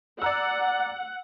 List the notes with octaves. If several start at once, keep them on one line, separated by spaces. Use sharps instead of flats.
D5 F#5 A#5 E6